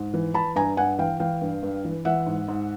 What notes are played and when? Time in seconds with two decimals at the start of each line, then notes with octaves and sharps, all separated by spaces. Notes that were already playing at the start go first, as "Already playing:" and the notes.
Already playing: G#2
0.14 E3
0.34 E3 A5 B5
0.55 G2 G#5 A#5
0.77 G2 F#5 G#5
0.99 E3 F5 G5
1.20 E3 F5 G5
1.41 G2
1.63 G2
1.85 E3
2.05 E3 E5 F#5
2.26 G#2
2.48 G#2